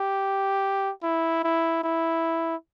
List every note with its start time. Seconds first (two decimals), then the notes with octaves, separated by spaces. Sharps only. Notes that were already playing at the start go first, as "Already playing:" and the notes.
Already playing: G4
1.03 E4
1.44 E4
1.84 E4